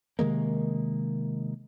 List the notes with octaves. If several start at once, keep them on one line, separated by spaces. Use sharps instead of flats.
C3 D#3 G#3 A#3